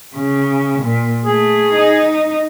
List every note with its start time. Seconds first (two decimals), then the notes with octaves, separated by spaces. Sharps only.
0.14 C#3
0.82 A#2
1.26 A3 G#4
1.73 D#4